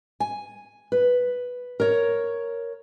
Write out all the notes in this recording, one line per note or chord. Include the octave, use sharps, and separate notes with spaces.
G#5
B4
A#4 C#5